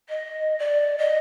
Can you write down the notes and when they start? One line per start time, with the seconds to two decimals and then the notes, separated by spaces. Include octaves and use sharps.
0.08 D#5
0.58 D5
0.98 D#5